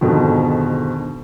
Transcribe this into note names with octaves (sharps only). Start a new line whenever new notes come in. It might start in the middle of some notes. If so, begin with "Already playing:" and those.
F2 G#2 B2 D3 D#3